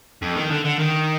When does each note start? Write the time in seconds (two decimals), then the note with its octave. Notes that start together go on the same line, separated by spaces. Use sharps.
0.22 F2
0.36 D#3
0.51 D3
0.65 D3
0.79 D#3